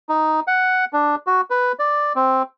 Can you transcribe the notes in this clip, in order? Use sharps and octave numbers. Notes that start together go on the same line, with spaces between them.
D#4
F#5
D4
F#4
B4
D5
C4